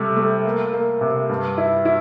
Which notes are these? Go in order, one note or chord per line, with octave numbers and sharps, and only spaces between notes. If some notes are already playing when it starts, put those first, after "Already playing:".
Already playing: C3 G3 A3
A3
A#3
A#3
C3
G2
E4
E4